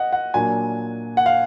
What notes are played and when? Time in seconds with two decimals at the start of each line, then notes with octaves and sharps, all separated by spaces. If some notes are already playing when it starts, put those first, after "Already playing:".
Already playing: D#5 F#5
0.12 F#5
0.34 A#2 F#3 A#3 D4 G#5
1.17 F#5
1.26 F5